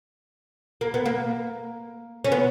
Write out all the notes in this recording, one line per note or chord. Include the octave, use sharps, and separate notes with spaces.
A#3
B3
A#3
C#4
B3